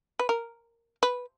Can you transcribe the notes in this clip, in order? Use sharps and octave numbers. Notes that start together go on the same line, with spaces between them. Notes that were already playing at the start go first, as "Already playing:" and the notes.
B4
A#4
B4